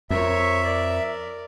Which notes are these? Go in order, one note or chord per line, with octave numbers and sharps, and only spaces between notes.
F2 A#4 C#5 E5
A#4 D5